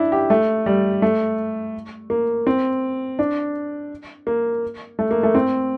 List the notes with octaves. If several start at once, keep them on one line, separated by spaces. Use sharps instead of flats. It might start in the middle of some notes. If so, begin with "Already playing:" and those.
Already playing: D4 E4
G4
A3
G3
A3
A#3
C4
D4
A#3
A3
A#3
A3
C4